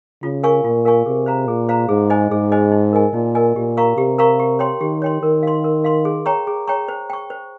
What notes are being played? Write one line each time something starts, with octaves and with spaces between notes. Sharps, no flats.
C#3 F4
A#4 F5 G#5 C#6
A#2 F4
A#4 F5 G#5 C#6
C3 G#4
C5 F5 A#5
A#2 G#4
C5 F5 A#5
G#2 G#4
C5 D#5 G#5
G#2 G#4
C5 D#5 G#5
D#4
A#4 D#5 G#5
A#2 D#4
A#4 D#5 G#5
A#2 G4
A#4 F5 A#5 C#6
C3 G4
A#4 F5 A#5 C#6
G4
C#5 G5 C6
D#3 G4
C#5 G5 C6
D#3 A#4
F5 C6
A#4
F5 C6
G#4
C#5 G5 A#5 C#6
G#4
C#5 G5 A#5 C#6
C5
G5 C#6
C5